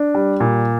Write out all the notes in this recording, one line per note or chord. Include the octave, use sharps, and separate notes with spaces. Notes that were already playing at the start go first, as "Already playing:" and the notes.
Already playing: D4
G3
A#2